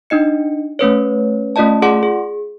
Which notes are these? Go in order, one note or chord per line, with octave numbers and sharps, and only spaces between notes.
D4 D#4 D#5 C#7
A3 C#4 B4 C#5
A3 C#4 F4 D5 D#5 A5
F4 G#4 D5 F#5 C6 D6
G#4